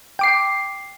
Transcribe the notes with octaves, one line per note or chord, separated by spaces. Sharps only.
G5 D6 C7